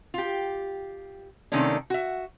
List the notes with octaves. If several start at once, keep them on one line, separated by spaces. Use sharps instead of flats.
F4 G4
C3 D#3 A3 A#3 C#4 D4
F#4 E5